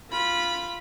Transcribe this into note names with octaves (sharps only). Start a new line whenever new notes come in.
F4 B5